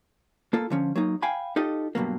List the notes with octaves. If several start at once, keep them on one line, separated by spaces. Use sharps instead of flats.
A#3 F4 A4
D3 F3 C#4
F#3 A#3 D#4
F5 G5 G#5 B5
D#4 F4 G4 A4 D#5
G2 B2 F#3 A#3